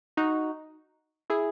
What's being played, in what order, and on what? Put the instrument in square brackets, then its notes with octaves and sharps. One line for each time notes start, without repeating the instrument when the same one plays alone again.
[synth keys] D#4 F#4
E4 G#4